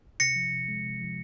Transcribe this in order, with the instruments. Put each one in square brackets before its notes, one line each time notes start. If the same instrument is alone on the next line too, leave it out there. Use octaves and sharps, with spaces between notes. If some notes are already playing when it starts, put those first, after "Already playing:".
[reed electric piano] C3 [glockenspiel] A#6 C#7
[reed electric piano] F3
C3
G#3
C3
F3